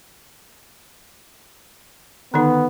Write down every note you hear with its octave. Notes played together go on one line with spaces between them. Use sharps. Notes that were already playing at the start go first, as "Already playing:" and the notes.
D3 D#3 B3 D#4